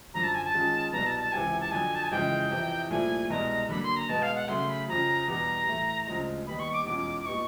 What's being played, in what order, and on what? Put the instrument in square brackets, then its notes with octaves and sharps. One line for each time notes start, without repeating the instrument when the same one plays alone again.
[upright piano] F#2 D3 F3 [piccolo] A#5
[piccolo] A5
G#5
A5
[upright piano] D#3 G#3 C#4 F4 G#4
[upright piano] C2 B2 F#3 B3 [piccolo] A#5
[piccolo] A5
A5
[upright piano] C#2 C3 E3 [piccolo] G#5
[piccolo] A5
[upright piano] F2 D3 F#3 [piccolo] G#5
[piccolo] A5
G#5
[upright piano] F2 C#3 E3 G#3 [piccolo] G5
[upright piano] F2 C3 E3
[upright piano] C2 A#2 F3 A3 [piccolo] G#5
[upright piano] C2 B2 G#3 [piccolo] A#5
[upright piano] D3 F#3 A#3 [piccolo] B5
[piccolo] C6
A#5
[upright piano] B2 G#3 B3 [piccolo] A5
[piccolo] F5
F#5
[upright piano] C#3 F#3 A3 [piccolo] C6
[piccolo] B5
[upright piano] F2 C#3 F3 [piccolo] A#5
[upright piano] E2 B2 G3 B3 [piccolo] A#5
[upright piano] A2 E3 A3
D2 C#3 F3 G#3
[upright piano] D#2 D#3 G3 B3 D#4 [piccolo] B5
[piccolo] C#6
D6
[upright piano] E2 B2 G#3 C#4 F4 [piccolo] D6
[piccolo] D6
[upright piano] A#2 G3 B3 D#4 [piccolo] C#6